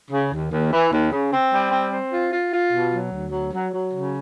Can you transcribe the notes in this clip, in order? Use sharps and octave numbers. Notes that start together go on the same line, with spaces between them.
C#3
D#2
D#2
E3
D#2
C#3
C4
G3
C4
C4
F4
F4
F4
B2
F#3
D2
F#3
F#3
F#3
C#3